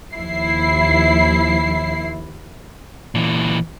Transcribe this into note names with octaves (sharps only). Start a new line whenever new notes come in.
D#2 F3 E4 C7
A#2 E3